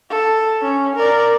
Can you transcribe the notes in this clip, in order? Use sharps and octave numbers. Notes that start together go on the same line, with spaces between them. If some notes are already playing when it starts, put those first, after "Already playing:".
A4
C#4
A#4 D5